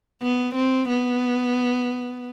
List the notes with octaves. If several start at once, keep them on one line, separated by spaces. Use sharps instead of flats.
B3
C4
B3